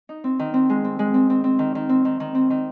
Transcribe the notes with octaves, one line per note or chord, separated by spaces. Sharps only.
D#4
C4
D#3
C4
G#3
C4
G#3
C4
C4
C4
D#3
D#3
C4
D#3
D#3
C4
D#3